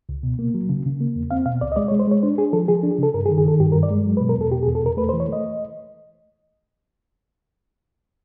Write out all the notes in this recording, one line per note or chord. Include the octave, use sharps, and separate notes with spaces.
C#2
B2
A#3
F#3
C#3
C#3
A#3
E2
C4 F5
B2 F5
C#2 D5
D#5
G#3 D5
C#5
G#3
C5
G#3 C#5
D4 C5
D4 G#4
F3 A4
F3 G#4
D4
G#4
C#3 A4
G2 A#4
G#4
D#3
G#4
D#3 A4
G2 G4
A#4
G2
D5
G#3
F#3
B4
B2
A#4
E2 A4
B2 G4
G#4
E2
A4
E2 A#4
A3 B4
C5
E3
C#5
A3 D#5